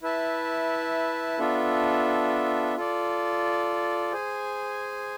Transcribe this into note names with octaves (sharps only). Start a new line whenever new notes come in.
E4 B4 E5 A5
B3 D4 F4 A4 E5
F4 A4 D5
G#4 C5 G#5